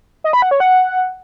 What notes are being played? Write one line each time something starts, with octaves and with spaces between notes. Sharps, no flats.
D#5
B5
F#5
C#5
F#5